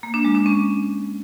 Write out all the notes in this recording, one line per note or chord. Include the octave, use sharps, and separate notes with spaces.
A#3
D4
G#3
D4
C#4